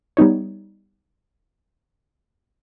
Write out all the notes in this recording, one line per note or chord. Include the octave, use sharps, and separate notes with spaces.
G3 B3 D#4 C#5